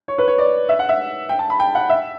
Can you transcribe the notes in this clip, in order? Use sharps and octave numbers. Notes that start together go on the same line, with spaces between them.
C#5
B4
C#5
D5
E5
F#5
E5
G5
A5
B5
G5
F#5
E5